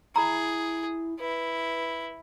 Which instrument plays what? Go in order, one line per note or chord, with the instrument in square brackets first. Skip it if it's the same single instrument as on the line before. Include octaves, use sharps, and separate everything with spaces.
[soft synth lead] E4 [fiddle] G#4 [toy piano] A#5 B5
[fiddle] E4 [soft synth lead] B4